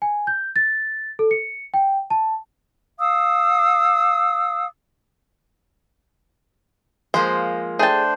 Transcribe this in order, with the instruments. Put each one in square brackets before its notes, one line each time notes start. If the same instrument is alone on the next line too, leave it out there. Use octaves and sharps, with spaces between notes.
[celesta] G#5
G6
A6
A4
C#7
G5
A5
[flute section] F5 D#6 E6
[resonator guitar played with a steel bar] F3 G#3 A#3 [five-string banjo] C5
[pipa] A3 G5 [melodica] D4 C5 [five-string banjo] G#4 A5